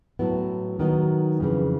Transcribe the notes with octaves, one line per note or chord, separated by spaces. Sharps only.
A2 F#3 B3 E4
D#3 F#3 B3 D#4
F2 C#3 E3